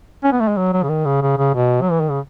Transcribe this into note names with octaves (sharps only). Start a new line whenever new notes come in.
C#4
B3
A3
G#3
F#3
F#3
C#3
D#3
C#3
C#3
C#3
B2
F#3
E3
D#3
C#3